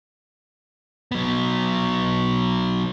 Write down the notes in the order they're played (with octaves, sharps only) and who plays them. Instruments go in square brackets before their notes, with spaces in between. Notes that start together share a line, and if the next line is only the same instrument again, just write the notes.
[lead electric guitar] F#3 B3